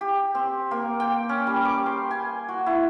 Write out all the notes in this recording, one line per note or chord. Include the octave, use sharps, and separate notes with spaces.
G4
C4
A#3
G5
C#4
G3
D6
C6
G#5
F#4
E4